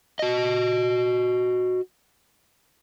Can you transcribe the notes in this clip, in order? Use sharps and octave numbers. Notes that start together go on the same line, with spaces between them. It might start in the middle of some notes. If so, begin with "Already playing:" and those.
F#4 D#5